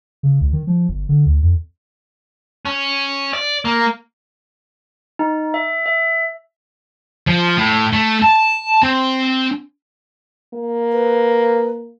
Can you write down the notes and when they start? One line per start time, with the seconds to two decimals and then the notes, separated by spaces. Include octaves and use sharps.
0.23 C#3
0.41 C#2
0.53 D#3
0.67 F3
0.89 G1
1.09 D3
1.26 D2
1.42 F2
2.65 C#4
3.33 D5
3.65 A#3
5.19 D#4
5.54 E5
5.86 E5
7.27 F3
7.57 A2
7.92 A3
8.22 A5
8.83 C4
10.54 A#3
10.93 B4